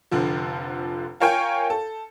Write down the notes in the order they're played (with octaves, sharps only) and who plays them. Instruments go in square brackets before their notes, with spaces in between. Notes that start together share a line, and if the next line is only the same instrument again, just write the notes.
[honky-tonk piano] F1 D3 F3
F4 A#4 C#5 F5 G5 G#5
A4